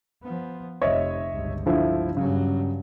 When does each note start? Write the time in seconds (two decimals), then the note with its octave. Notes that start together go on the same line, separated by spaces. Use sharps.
0.23 F3 B3
0.82 F1 F2 C#5 D#5 E5
1.31 G1 C#2
1.66 D3 F3 E4
2.17 G2 C#3 F#3